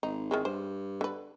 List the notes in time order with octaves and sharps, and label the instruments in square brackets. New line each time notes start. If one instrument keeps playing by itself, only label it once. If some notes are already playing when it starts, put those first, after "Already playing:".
[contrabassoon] G#1 [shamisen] D#4
[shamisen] D#3 E3 G#3
[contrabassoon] G2 [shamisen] C5
[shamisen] D3 B4